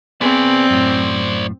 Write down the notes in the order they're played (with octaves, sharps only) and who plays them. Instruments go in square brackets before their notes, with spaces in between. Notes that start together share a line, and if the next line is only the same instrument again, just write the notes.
[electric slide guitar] B3 G#4 [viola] C4 [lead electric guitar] C5 D5
[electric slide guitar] F#2 A2